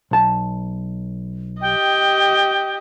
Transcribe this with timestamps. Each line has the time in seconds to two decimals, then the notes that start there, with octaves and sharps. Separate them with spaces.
0.11 B1 A5
1.61 G4 D#5 G5